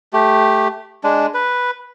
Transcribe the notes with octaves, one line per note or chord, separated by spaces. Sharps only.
A3 G4
G#3 D4
B4